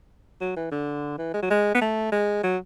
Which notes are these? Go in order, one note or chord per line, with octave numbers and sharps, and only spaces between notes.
F#3
E3
D3
E3
G#3
F#3
G#3
B3
A3
G#3
F#3